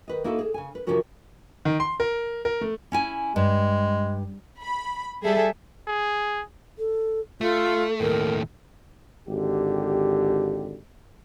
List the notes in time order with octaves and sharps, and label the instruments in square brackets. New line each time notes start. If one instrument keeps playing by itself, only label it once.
[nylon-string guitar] D#3 B4 D#5
A#3 D#4 E4 F#4 A4
G#4 A4
C#3 G#5
B4
C3 E3 F3 C#4 F#4 A#4
[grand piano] D#3
C6
A#4
A#4
A3
[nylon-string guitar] C#4 E4 G#5
[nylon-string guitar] G2 [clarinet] G#3
[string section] B5
G3 G#4 A4 E5
[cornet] G#4
[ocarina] A4
[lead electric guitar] A3 [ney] F4 [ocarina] A4
[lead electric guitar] D#2 A2 [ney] A#4
[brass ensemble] G#1 D3 G4